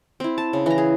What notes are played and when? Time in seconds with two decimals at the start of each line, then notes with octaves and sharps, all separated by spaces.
0.20 C4 E4
0.38 A5
0.53 C#3
0.66 E3 A#5
0.78 G#4